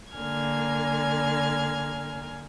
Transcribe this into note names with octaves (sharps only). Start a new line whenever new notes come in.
D3 A#3 G#5 F6 G#6